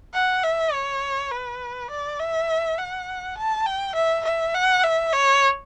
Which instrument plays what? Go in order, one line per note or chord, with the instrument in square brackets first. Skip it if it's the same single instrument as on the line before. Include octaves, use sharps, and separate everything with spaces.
[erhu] F#5
E5
C#5
B4
D5
E5
F#5
A5
G5
E5
E5
F#5
E5
C#5